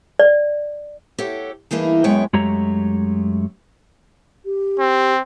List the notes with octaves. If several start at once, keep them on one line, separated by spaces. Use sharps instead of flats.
D5
G4 A4 C#5 F#5
G2 E3 A#3 D#4 G#4
F#2 G#3 B3 C#5 G5
F#2 G#3 A3 G4 C#5 A#5
G4
C4